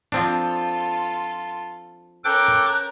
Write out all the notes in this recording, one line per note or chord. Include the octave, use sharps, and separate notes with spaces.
F3 C4 D4 F4 A4
C#4 A4 A#4 G5 D6 F#6